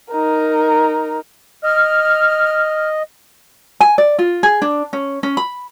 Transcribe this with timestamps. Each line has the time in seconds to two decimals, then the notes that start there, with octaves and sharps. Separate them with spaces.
0.10 D#4 A#4
1.64 D#5 F6
3.81 G#5
3.98 D5
4.19 F4
4.43 G#4
4.62 D4
4.93 C#4
5.23 C#4
5.37 B5